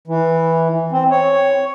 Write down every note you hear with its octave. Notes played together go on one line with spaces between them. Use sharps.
E3
C4
C#5